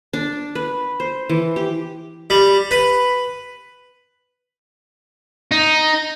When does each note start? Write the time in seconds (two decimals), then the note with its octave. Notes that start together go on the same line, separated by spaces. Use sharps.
0.13 D4
0.55 B4
1.00 C5
1.29 E3
1.56 G4
2.30 G3
2.71 B4
5.51 D#4